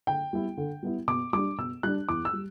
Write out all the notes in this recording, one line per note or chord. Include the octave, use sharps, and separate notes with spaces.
D3 G5
G3 B3 E4
D3
G3 B3 E4
B2 D6
G3 D4 D6
B2 E6
G3 D4 F#6
E2 D6
E6
G3